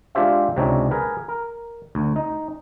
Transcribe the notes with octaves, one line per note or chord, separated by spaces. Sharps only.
G#3 D4 F4 G4 C5 E5
C#2 C3 C4 D4 D#4 C#5
G#4 A#4 B4
A#4
D2
D#4